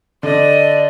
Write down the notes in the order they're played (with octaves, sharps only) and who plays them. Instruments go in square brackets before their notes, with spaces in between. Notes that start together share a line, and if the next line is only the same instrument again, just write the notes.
[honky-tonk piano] D3 [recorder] D5 [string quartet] D#5